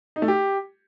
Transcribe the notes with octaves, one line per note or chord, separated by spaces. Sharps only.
D#4
A3
G4